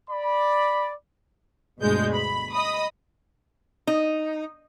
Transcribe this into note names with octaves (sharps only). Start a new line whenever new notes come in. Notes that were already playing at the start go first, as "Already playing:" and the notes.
D5 B5
G1 D2 B2 G#3 G6
B5
D#5 B5 D#6
D#4